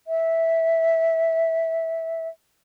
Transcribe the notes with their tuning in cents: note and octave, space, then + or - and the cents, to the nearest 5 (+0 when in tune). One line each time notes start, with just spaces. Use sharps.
E5 -10